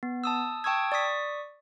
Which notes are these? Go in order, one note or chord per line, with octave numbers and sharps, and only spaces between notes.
B3
A5 D#6 E6
G5 A5 C#6 D#6 E6 G#6
D5 C#6 D#6 B6